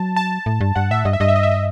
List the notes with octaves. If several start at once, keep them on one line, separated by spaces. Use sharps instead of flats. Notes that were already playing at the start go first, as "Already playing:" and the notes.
Already playing: F#3 A5
A5
A2
G2
G2 F#5
A2 E5
G2 D#5
E5
G2 D#5
E5
D#5
E5
D#5